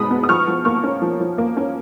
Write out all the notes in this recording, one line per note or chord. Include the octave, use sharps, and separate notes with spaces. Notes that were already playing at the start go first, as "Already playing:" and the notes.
Already playing: B2 G#3 B3 B5 D#6
B3
D#6
F3 C#6 F6
F3
A#3 C#6 F6
C#4
F3
F3
A#3
C#4